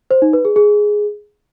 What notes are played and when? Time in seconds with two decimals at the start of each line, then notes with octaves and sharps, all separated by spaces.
0.11 C5
0.22 D#4
0.33 B4
0.45 G#4
0.56 G#4